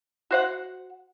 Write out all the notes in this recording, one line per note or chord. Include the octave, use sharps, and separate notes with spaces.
F#4 C5 F#5